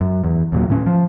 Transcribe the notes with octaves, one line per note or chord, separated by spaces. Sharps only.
F#2
E2
D#2 A#2 F#3
A2 C#4
F3